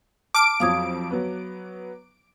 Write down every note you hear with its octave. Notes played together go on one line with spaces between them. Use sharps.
A5 D6 F6 D7
F2 F3 F#3 F5 D#6 G#6
F#3 B3